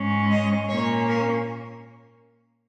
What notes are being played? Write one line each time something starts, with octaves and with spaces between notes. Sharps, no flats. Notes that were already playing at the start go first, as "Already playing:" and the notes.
Already playing: G#2 G#3 C#4
D#5
A#2 A#3 C#4 C#5
A#4